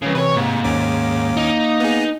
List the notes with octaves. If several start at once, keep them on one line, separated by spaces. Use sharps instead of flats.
C2 C#3 E3
C3 B4 C#5
G#2 A#3
D#2 C#4 D6
D#4
B3 G#4